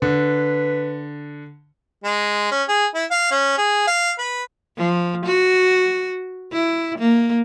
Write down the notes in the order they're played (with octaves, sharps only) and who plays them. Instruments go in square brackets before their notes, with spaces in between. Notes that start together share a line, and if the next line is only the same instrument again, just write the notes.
[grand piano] D3 [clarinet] B4
[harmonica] G#3
C#4
G#4
E4
F5
C#4
G#4
F5
B4
[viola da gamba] F3
F#4
E4
A#3